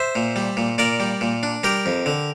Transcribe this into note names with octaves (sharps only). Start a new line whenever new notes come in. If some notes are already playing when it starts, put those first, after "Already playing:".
Already playing: C5 E5
A#2
G3
A#2
A#2 A#4 D5
G3
A#2
D4
G3 G4 A#4
F2
D3